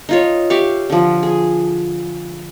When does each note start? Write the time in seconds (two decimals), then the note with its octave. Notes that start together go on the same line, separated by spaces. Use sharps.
0.09 D#4 F4 C#5
0.50 G4 E5 F5 C#6
0.90 D3 F3
1.23 G#4